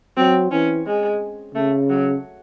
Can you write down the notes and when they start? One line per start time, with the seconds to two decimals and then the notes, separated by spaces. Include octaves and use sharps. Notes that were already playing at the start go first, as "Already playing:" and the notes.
0.17 F#3 C4
0.51 E3 C#4
0.86 G#3
1.55 C#3 A3
1.90 F#3